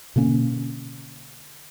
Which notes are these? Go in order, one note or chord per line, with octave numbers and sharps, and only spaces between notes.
B2 D3 A#3 C#4